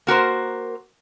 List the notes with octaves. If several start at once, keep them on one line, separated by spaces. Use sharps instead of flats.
A#3 F#4 A#4 C5